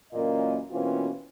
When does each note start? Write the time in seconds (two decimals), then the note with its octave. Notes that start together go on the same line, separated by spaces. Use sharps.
0.13 F#2 A#2 E3 A#3 C#4 D#5
0.71 B2 E3 A#3 C4 C#4 F4